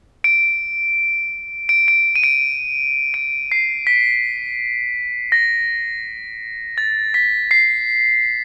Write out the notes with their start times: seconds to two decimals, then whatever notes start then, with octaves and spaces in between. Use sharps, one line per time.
0.24 D7
1.69 D7
1.88 D7
2.16 D#7
2.24 D7
3.14 D7
3.52 C7
3.87 B6
5.32 A#6
6.78 A6
7.14 B6
7.51 C7